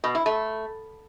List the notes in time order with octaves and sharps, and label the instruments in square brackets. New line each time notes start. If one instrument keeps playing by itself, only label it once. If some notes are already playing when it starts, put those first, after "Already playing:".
[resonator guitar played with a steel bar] B2
E4
A3